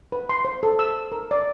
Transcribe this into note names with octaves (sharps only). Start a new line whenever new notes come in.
B4
C6
C5
A4
E6
A#4
D5